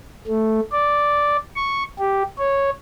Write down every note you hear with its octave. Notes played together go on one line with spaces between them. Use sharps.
A3
D5
C#6
G4
C#5